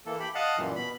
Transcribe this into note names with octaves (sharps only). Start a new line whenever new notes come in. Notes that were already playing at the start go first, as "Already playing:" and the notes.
E3 A#3 A4
G4 B5
D#5 F5 F#5 A5
F#2 A#2 E3 G3
B2 B5